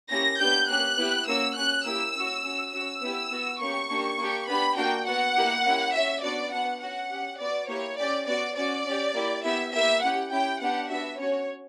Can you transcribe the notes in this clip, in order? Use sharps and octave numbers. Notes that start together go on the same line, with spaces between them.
A#3 C#4 E4 G4 A#6
B3 D4 G4 G6
A#3 C#4 G4 F#6
B3 E4 G4
A#3 C#4 F#4 E6
C#4 G4 F#6
A#3 E4 G4 E6
C#4 F#4
C#4 F#4
C#4 F#4 E6
B3 E4 G4
B3 F#4
A#3 C#4 G4 C#6
A#3 D4 G4
A#3 D4 G4
B3 D4 G4 B5
A#3 D4 F#4 G5
B3 F#4 F#5
A#3 E4 G4
A#3 C#4 E4 G4
C#4 F#4 E5
B3 D4 F#4 D5
B3 D4 F#4 F#5
C#4 F#4 F#5
C#4 G4
B3 F#4 D5
A#3 E4 G4 C#5
C#4 G4 D5
B3 F#4 D5
C#4 F#4 D5
C#4 G4
A#3 E4 G4
B3 E4 G4 E5
A#3 E4 G4 E5
C#4 E4 G4 F#5
C#4 E4 G4 G5
B3 D4 G4 F#5
B3 D4 F#4 E5
C#4 F#4 C#5